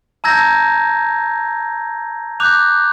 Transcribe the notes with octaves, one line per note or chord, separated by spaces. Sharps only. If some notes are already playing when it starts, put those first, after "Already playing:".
A5 A#5 E6 G6 G#6 A#6
D6 F#6 G6 F7